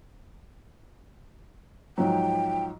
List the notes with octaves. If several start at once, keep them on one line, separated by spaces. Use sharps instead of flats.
G#2 F3 F#3 G5